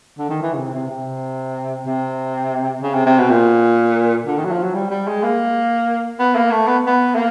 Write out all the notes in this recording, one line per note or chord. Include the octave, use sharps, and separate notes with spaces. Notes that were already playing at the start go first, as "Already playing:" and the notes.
D3
D#3
E3
C#3
C3
C3
C3
C3
C#3
C3
C3
B2
A#2
D3
D#3
F#3
F3
F#3
G3
G3
G#3
A#3
B3
A#3
A3
B3
B3
A#3